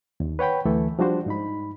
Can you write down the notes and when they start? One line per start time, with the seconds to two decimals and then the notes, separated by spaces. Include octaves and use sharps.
0.20 D#2
0.39 B4 C#5 F#5 G5 B5
0.65 D2 E3 A3 E4 A4
0.99 F3 G3 D4 F#4 C5
1.26 G#2 D#4 B5